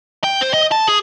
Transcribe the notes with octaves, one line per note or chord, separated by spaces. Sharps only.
G5
C5
D#5
A5
G#4